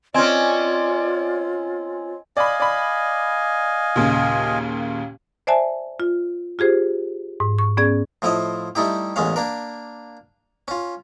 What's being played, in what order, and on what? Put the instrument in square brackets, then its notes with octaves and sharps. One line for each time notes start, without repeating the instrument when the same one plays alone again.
[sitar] C4 C#4 [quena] F4 [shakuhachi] D5 [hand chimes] D#5 G#5 G#6
[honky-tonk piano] D5 B5 [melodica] D#5 F5 G#5
[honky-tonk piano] D5 B5
D#2 A#2 C#3
[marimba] C5 D5 E5 G#5 A5
F4
F4 G4 G#4 C5
G#2
C#6
B3 C#4 G#4 D5 G#6
[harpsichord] A2 F3 E4 F4 D#5
G3 A3 D#4 E4 G4
A1 E2 G#3 C#4 F5
A#3 D4 A#4
C#4 F4